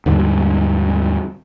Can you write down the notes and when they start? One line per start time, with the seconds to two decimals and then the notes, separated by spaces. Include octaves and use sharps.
0.06 D#2 G#2 D3 G3